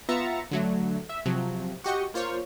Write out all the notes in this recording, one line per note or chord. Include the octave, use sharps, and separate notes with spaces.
B3 F4 E5 A#5 A6 C#7
D3 F#3 A3
E5
C3 F3 F#3
F#4 G4 D#5 C#6
A#3 F4 C5 C#5